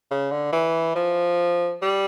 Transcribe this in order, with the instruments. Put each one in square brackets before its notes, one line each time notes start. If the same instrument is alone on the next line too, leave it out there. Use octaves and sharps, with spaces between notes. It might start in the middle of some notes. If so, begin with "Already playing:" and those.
[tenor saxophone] C#3
D3
E3
F3
G3